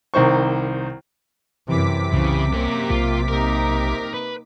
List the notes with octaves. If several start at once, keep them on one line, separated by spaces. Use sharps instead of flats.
C2 D#3 C5 C#6
F#2 C3 E3 D6 B6
C2 C#3 E3
F#2 A#3 A#4
B1 F4
A#3 D#4 A#4
B4